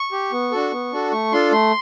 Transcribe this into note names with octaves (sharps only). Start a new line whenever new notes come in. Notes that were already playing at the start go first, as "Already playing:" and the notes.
Already playing: C#6
G4
B3
D4 F#4 A4
B3
D4 F#4 A4
A3 C#6
D4 F4 A4 C6
A3 C6